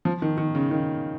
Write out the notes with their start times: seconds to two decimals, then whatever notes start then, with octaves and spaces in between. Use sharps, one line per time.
0.05 F3
0.22 D#3
0.38 D#3
0.55 C#3
0.71 D#3